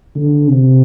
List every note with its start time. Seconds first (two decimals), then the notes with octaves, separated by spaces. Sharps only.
0.15 D3
0.49 C3